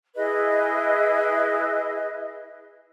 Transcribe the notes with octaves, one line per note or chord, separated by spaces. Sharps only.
E4 G#4 B4 D#5